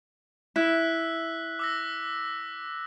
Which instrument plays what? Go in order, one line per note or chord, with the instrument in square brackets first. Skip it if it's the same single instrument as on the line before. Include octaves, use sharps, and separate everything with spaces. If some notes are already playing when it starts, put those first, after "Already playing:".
[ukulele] E4 [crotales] E6 F#6 B6
[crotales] D6 E6 A#6